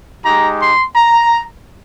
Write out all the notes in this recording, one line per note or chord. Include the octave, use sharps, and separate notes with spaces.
G#3 D#4 G4 A#5
C6
A#5